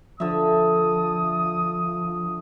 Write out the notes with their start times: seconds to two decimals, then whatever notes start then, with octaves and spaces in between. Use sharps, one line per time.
0.20 D3 F3 E5 D#6